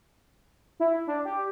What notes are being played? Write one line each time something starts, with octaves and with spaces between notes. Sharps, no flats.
E4
D4
G4